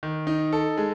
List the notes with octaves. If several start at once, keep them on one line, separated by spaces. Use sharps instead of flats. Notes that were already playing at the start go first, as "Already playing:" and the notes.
D#3
D#4
A4
G#3